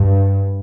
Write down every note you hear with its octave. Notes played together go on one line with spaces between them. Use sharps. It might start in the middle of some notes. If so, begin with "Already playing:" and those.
Already playing: G2